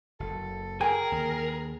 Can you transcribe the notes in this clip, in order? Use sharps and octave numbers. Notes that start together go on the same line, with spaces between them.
F#1 A4
G#4 A#4 G5 G#5
D#2 D3